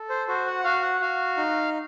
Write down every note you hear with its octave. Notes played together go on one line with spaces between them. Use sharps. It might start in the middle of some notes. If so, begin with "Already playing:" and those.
Already playing: A4
C5
F#4 C5
F#5
F#4 F5
F#5
F#4 F5
D#4